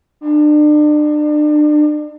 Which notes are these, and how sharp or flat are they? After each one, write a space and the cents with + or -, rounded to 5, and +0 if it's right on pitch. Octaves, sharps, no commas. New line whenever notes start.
D4 +35